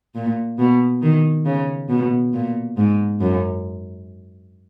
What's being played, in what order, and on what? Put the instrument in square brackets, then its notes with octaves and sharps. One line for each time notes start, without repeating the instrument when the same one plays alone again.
[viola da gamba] A#2
B2
D#3
C#3
B2
A#2
G#2
F#2